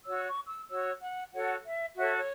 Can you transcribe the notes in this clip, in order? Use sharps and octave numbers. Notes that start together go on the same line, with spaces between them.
F#4 C#5 E6
C#6
E6
F#4 C#5 E6
F#5
F#4 A4 C#5 F#5
E5
F#4 A4 C#5 E5
C#5